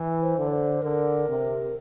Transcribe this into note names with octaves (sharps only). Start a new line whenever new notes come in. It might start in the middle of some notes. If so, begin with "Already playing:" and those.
Already playing: E3
C5
D3
D5
C5
D3 A#4
C3